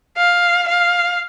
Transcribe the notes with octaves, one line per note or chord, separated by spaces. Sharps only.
F5
F5